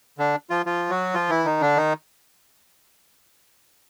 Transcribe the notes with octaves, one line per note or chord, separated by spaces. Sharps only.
D3 D4
F3 F4
F3 F4
F#3 F#4
F3 F4
E3 E4
D#3 D#4
D3 D4
D#3 D#4